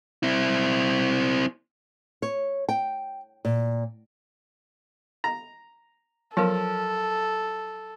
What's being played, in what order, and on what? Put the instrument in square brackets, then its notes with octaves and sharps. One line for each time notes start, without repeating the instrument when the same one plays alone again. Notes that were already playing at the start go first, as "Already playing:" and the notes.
[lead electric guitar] C4 E4
[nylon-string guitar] C#5
G5
A#2
[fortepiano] A#5
[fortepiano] F3 [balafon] F#3 A#4 [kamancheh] A4